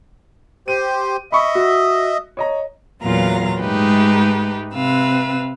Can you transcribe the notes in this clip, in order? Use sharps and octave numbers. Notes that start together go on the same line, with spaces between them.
G4 C5 D#7
D#5 E5 B5 C#6
F#4
C#5 D#5 A#5
E2 A#2 F#3 F4 F5 A#5
G#2 G#3 A3 D#4 G4 B4
C3 C4 B4 F5 E6